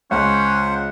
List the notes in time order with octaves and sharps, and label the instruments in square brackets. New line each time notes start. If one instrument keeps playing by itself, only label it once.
[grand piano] C#2 [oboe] C#4 [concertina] C5 F#5